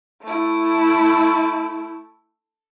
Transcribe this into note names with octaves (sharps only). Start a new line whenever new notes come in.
A3 E4